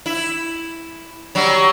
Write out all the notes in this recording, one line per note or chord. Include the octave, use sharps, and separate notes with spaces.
E4
F#3 G3